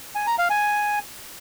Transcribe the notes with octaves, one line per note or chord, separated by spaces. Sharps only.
G#5
A#5
F5
G#5